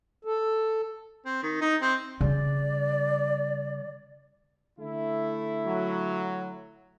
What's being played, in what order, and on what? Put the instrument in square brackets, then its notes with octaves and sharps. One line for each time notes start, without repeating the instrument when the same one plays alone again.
[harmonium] A4
[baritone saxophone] C4
D#3
D#4
C4
[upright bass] C#3 G3 [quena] D5
[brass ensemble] D3 A3 E4
[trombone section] F#3